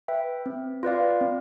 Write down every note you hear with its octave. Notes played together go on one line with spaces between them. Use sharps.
B4 E5 G5
C4
F4 B4 D5 F5
C4